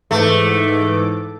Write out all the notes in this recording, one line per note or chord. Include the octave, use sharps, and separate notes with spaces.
G#2 E3 A3 D6